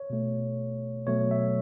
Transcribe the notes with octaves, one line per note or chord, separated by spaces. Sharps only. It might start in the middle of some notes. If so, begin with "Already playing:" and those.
Already playing: C#5
B2 A3
B2 F#3 A3 C#5
E5